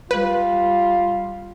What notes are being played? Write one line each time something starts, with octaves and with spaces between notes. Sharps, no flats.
G3 F4 B4